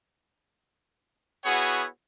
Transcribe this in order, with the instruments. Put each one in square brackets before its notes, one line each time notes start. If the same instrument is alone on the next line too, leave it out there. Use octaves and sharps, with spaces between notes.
[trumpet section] B3 E4 F#4 G#4 C#5 F#5